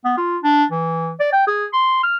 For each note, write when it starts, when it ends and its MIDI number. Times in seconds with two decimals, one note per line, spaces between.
0.05 0.13 59
0.17 0.37 65
0.43 0.64 62
0.71 1.13 52
1.20 1.32 74
1.32 1.45 79
1.47 1.67 68
1.73 2.02 84
2.03 2.17 89